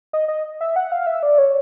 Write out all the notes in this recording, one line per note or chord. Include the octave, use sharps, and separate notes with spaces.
D#5
D#5
E5
F#5
F5
E5
D5
C#5